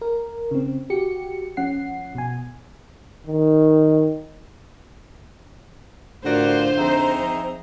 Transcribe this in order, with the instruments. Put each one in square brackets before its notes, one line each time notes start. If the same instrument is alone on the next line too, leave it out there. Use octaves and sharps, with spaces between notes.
[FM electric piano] A#4
C#3 C4
F#4 G4 C#7
F3 C#4 F#5 C7
B2 G#5
[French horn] D#3
[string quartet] A2 F4 F5 [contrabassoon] D3 [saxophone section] F#4 A#4 D5 [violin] C5
[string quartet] F2 C4 A#5 [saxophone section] D#4 G#4 E5